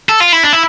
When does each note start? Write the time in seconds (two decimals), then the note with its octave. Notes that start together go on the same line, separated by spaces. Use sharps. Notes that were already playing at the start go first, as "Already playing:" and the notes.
0.09 A4
0.20 F4
0.33 E4
0.44 D4
0.53 E4